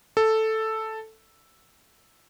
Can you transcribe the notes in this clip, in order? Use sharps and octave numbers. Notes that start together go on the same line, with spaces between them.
A4